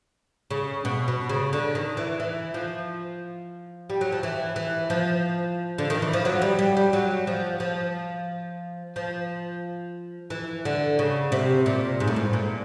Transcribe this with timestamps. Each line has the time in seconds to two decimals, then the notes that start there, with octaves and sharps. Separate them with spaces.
0.51 C#3
0.85 B2
1.08 B2
1.29 C#3
1.53 D3
1.75 D#3
1.97 E3
2.20 E3
2.54 F3
3.90 G3
4.01 F#3
4.12 F3
4.23 E3
4.56 E3
4.90 F3
5.78 D3
5.90 D#3
6.02 E3
6.13 F3
6.25 F#3
6.42 G3
6.59 G3
6.77 G3
6.93 F#3
7.27 F3
7.60 F3
8.96 F3
10.30 E3
10.65 D3
10.99 C#3
11.32 C3
11.66 A#2
12.00 G#2
12.08 A2
12.16 G#2
12.33 A#2